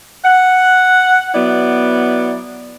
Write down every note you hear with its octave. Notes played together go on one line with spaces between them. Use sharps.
F#5
F#3 B3 E4 D5